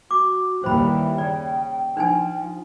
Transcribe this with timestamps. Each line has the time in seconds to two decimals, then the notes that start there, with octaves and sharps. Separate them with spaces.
0.11 F#4 D6
0.64 D#2 E3 G3 C5 G5 B5
1.18 C#3 D5
1.97 F3 D4 D#4 G#5